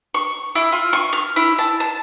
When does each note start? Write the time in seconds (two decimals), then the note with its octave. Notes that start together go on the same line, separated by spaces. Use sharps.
0.15 C#6
0.55 E4
0.72 F4
0.93 C#6
1.13 F6
1.36 E4
1.58 A5
1.80 A5